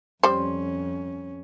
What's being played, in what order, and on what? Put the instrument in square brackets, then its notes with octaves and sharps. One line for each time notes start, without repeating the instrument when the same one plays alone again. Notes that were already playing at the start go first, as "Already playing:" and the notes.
[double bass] F2 C#4 [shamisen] G3 C5